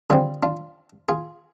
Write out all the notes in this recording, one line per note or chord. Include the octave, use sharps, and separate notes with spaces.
D3 G3 C4 F4 G#4
D4 F4
F4 G#4